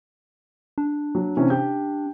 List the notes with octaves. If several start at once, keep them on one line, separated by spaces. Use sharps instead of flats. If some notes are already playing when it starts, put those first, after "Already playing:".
D4
F#3
C3 E3 C#4
G4 G6